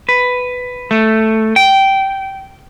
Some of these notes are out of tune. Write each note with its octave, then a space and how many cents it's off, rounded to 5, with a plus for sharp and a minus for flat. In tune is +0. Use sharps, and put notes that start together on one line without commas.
B4 +10
A3 +0
G5 -15